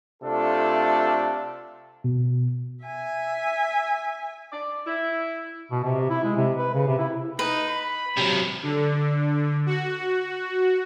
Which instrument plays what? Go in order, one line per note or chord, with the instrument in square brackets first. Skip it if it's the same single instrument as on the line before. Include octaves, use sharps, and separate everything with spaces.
[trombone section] C3 A3 D4 F4 A4
[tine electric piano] B2
[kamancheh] E5 G#5
[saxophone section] D5
E4
[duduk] B2
C3
E4
G#3
C3
B4
C#3
C3
E4
[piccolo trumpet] D#4 [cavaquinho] B4
[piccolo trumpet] B5
[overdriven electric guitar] C3 F#3
[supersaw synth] D3
F#4